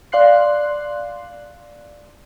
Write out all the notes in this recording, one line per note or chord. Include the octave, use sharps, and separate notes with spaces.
D5 F5 C6 F#6 C7